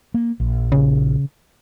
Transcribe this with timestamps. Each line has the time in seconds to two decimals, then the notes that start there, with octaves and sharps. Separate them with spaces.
0.14 A#3
0.40 A#1
0.72 C#3